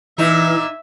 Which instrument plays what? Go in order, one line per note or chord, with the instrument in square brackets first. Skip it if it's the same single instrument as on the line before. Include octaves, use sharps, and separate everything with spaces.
[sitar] A#2 D#4 [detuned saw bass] E3 [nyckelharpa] E5